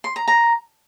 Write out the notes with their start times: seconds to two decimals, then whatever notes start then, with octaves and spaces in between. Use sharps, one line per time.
0.04 C6
0.16 A#5
0.28 A#5